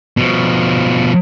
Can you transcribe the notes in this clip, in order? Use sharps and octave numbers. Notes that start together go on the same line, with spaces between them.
B2 F3